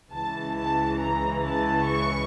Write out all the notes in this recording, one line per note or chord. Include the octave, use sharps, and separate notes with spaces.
C#2 C#3 E3 A5
A5
A#5
A5
C#6